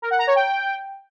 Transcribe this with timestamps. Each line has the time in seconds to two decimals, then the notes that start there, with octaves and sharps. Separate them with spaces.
0.02 A#4
0.10 F#5
0.19 A#5
0.27 C#5
0.36 G5